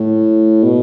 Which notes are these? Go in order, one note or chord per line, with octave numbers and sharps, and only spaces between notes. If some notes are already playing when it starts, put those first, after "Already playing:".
Already playing: A2
B2